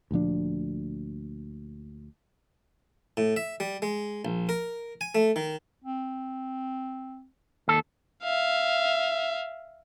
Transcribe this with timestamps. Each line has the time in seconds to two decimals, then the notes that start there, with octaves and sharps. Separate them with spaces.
0.11 D2 A#2 F3 D4
3.17 A2
3.36 E5
3.60 G3
3.82 G#3
4.25 A#1
4.49 A#4
5.01 G#5
5.15 A3
5.36 D#3
5.84 C4
7.68 D#2 A4
8.24 E5 F5